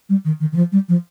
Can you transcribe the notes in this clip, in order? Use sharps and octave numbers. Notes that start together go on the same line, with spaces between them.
G3
D#3
D#3
D#3
F3
G3
F3